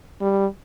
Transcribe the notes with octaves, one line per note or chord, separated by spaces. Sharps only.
G3